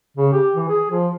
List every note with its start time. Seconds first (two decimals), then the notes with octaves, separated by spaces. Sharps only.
0.17 C#3
0.32 G4
0.56 E3
0.69 G#4
0.91 F3